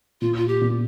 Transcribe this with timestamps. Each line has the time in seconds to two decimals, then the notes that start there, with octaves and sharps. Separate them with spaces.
0.21 A#2 F4
0.36 F4
0.48 G4
0.61 A#2